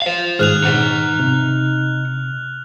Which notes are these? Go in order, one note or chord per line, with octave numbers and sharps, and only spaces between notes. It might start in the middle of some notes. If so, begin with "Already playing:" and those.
C5 F5
G#2 D#3 G#4 F6 F#6 F7
D#4 F#5
C3